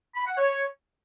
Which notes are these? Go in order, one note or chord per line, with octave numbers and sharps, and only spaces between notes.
B5
F#5
C#5